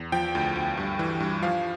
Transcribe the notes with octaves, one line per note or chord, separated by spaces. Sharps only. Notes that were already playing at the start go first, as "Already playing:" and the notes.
Already playing: E2
F3 G5
D2
D2
G2
E3
G2
F3 F5